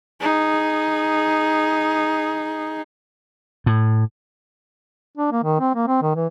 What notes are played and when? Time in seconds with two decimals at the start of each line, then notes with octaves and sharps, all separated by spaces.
0.21 D#4 G#4
3.66 A2
5.17 D4
5.32 A#3
5.43 D#3
5.60 C4
5.75 A#3
5.87 C4
6.02 D#3
6.15 E3